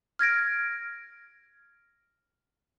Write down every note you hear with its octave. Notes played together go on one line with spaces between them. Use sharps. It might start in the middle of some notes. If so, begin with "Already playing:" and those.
F6 G#6 A#6 D7